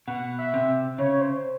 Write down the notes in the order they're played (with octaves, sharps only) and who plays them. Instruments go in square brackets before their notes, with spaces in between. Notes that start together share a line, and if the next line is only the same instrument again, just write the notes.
[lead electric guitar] B2 [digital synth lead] F#5
[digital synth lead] E5
[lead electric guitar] C3
[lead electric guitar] C#3 [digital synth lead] C#5
[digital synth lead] C5